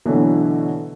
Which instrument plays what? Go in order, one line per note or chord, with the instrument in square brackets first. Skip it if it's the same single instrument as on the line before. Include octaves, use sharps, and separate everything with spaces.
[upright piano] B2 D3 E3 F#3 A3 B3